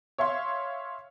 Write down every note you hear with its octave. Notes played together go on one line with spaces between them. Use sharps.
C#5 E5 F5 C6